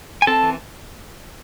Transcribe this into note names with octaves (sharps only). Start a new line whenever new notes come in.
G#5
C4 A4 A5
E3